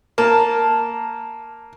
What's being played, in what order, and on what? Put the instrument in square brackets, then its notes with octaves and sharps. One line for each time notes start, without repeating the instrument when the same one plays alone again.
[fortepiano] A#3 [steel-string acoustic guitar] A5